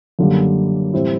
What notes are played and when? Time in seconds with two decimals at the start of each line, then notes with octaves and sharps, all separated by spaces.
0.19 F#2 D3 G3 A#3
0.93 A2 E3 G3 C4 E4